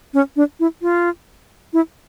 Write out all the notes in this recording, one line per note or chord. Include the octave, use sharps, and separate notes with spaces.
C#4
D4
E4
F4
E4